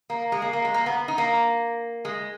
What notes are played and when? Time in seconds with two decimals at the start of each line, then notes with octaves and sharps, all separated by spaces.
0.10 A#3
0.32 G#3
0.42 A#3
0.53 A#3
0.65 G#3
0.74 A#3
0.86 B3
1.08 D#4
1.18 A#3
2.05 G#3